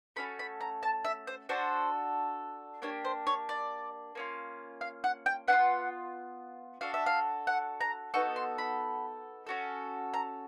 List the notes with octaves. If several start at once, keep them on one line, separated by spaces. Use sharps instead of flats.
A3 C#4 F#4 A4 B5
B5
A#5
A5
E5
C5
D4 F#4 A4 C5
A#3 D4 G4 C#5
C5
C#5
D5
A#3 C#4 F4
F5
F#5
G5
B3 D4 F4 F#5
D4 F#4 A4 F5
E5
F5
F#5
A#5
B3 D#4 F#4 A4 C#6
C6
B5
C#4 F#4 A4
A#5